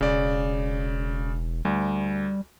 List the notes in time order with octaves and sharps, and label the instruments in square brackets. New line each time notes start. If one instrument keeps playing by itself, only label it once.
[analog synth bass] E1 [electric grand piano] C#3 D5
[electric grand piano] D2 [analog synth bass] G3